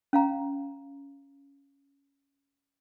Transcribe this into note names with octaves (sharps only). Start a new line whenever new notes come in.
C#4 F5 A#5